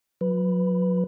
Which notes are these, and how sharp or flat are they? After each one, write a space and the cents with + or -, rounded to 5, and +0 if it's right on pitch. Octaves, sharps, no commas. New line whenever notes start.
F#3 -30 B4 +0